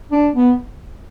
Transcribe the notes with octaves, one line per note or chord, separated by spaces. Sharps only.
D4
B3